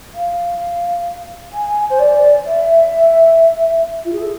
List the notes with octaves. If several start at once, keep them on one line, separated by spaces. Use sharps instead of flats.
F5
G#5
C5
D5
E5
F4
G#4
A4